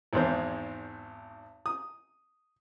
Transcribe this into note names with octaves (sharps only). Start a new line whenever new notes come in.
G#1 E2 G#2 C5
D#6